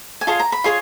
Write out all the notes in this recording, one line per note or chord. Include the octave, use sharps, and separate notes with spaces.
G#5
F4 G#4 C#5 A5
A#5
B5
F4 G#4 C#5 C6